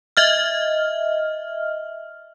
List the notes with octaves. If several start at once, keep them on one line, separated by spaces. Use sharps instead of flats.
D#5 E5 F6